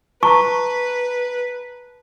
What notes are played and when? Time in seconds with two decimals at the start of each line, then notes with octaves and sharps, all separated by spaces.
0.23 B4 A5 A#5 C#6